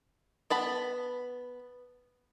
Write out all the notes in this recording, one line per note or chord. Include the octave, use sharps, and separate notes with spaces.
B3 A5 B5